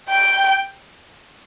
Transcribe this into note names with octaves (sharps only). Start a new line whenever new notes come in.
G5